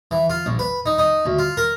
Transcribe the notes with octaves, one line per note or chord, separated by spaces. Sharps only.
E3
F4
A#1
B4
D#4
D#4
D2
F4
A#4